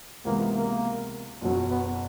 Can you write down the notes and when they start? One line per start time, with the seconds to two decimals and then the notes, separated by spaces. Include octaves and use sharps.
0.25 C#2 C3 E3 G#3 A#3 B3
0.54 A#3
1.41 F#1 E2 B2 F#3
1.70 B3